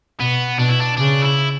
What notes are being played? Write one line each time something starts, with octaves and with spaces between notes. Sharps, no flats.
B2 B3
B2 D4
E4
D4
C#3 D4
E4